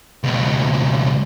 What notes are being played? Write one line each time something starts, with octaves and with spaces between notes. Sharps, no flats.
C#2 B2